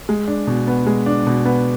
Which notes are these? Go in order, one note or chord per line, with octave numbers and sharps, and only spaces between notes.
G#3
D4
B2
B3
G#3
D4
B2
B3